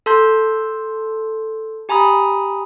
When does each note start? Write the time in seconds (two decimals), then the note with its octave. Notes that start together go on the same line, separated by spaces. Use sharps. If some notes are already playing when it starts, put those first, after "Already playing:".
0.06 A4 A5 C6 G6
1.89 G4 G#5 A#5 B5 D#6